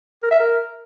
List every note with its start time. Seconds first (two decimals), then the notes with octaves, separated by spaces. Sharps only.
0.23 A#4
0.31 E5
0.39 A#4